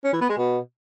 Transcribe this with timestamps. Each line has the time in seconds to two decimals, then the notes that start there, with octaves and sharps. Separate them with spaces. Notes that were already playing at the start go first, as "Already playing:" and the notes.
0.04 C#4
0.13 E3
0.21 B3
0.29 G#3
0.38 B2